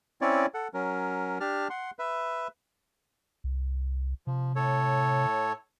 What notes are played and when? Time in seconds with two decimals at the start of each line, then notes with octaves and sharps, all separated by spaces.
0.21 C4 C#4 E4 C#5 D5
0.54 A4 F#5
0.74 F#3 C#4 A#4
1.40 D4 G4 A5 F6
1.70 F#5 C6
1.99 B4 E5
3.44 C2
4.27 C3 F3
4.56 A2 A4 C#5